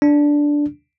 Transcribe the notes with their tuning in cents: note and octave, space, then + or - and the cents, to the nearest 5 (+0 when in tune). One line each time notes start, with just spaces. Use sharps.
D4 -5